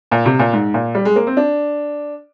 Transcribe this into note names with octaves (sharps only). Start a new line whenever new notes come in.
A#2
C3
A#2
G#2
A#2
G3
G#3
A#3
C4
D4